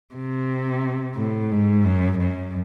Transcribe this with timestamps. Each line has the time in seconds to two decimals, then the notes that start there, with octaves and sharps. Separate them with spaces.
0.15 C3
1.16 A2
1.51 G#2
1.85 F#2
2.19 F#2